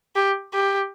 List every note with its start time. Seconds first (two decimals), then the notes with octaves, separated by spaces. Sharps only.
0.16 G4
0.53 G4